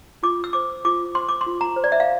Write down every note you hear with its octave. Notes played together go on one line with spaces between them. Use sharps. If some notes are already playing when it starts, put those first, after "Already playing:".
F4 D6
E6
C5 D6
F4 D6
C5 C6
D6
C6
F4
A#5
C5
D5
E5
F5